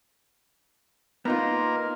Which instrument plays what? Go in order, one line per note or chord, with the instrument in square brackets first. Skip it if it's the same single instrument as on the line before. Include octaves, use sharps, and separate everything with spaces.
[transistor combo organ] A#3 [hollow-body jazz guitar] B3 D#4 F4